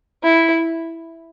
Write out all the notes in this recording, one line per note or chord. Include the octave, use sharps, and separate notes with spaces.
E4